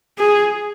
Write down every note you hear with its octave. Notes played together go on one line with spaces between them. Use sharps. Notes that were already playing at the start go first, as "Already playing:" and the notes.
G#4